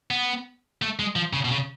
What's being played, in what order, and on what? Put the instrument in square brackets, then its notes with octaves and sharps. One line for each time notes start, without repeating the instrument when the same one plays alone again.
[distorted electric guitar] B3
A3
G#3
F3
C#3
B2
C#3